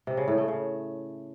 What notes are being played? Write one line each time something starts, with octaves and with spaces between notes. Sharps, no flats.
C3
C#3
A2
A3
C#3